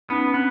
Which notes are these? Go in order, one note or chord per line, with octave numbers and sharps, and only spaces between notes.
B3 C#4 D#4
B3 C4 D4